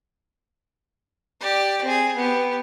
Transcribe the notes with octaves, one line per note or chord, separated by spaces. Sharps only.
G4 D5
C4 G#4
B3 G4